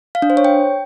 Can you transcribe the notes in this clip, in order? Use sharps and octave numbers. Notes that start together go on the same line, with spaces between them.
F5
D4
C5
C#5
G5